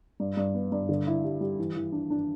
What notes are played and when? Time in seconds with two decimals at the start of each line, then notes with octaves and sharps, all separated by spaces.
0.20 G2
0.37 G2
0.54 B3
0.72 G2
0.89 D3
1.07 E4
1.24 G3
1.41 G3
1.59 E3
1.76 E3
1.92 D4
2.10 D4